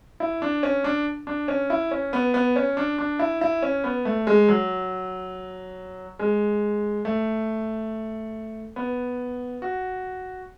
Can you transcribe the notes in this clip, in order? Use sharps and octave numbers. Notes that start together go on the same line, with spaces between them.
E4
D4
C#4
D4
D4
C#4
E4
C#4
B3
B3
C#4
D4
D4
E4
E4
C#4
B3
A3
G#3
F#3
G#3
A3
B3
F#4